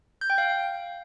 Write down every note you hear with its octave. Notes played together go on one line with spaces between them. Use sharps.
G6
G5
F5